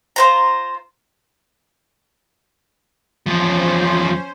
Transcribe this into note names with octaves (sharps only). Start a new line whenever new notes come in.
F4 C5 A#5
E2 F3 C#4 C5